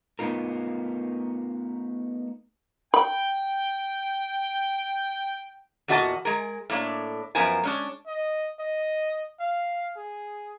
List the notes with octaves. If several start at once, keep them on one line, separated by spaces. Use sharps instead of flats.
A3 B3 D#4 F4 A#4
G5 B5
E2 A#2 F#4 D#5 G#5 A5
G#3 G#4 A#4
A2 A#3 D4
F#2 F3 B3 A#4 C5 G#5
G#3 C#4 D4
D#5
D#5
F5
G#4